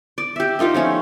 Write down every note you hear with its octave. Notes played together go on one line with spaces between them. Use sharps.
D5
G4 E5
D#4 F4 A#4 D#5
F3 A3 C#4